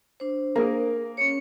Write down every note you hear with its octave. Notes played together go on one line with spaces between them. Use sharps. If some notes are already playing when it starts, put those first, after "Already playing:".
D4 C5
A#3 G#4 A#4
C#4 C#5 C#7